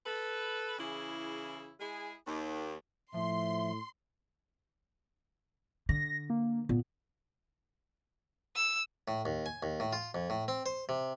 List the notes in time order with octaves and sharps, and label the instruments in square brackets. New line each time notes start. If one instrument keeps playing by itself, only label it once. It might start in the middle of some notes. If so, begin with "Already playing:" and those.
[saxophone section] A4 B4
C#3 E3 E4 G#4
G#3 E4 G#4
D#2
[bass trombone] A2 [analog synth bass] F3 [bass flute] E5 [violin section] C6
[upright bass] D3 [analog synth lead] A#6
[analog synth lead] A#3
[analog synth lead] A#2 [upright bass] B3
[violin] E6
[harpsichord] A2
D#2
G#5
D#2
A2
F4
F2
A2
C4
C5
C3